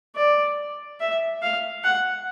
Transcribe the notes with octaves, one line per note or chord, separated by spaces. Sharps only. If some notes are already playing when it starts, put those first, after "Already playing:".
D5
E5
F5
F#5